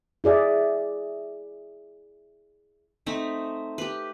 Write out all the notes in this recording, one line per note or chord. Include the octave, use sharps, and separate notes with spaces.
E4 G#4 D5 E5
A3 C4 D#4
G4 B4